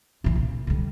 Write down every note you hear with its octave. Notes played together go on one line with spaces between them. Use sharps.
A#2 E3
A#2
D3 G3